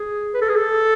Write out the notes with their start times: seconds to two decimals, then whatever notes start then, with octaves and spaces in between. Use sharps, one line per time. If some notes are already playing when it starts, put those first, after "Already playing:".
Already playing: G#4
0.34 B4
0.42 A4
0.49 G#4
0.56 A4